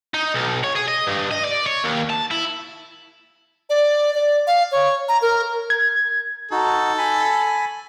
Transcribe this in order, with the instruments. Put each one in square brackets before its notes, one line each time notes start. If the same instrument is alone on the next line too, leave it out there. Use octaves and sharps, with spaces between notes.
[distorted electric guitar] D#4
B1
C#5
G#4
D#5
G2
D#5
D5
C#5
D#2
A5
E4
[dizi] D5
D5
F5
C#5
A#5
A#4
[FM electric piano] G#6
[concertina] D#4 F#4 [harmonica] A4
[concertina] G#5 B5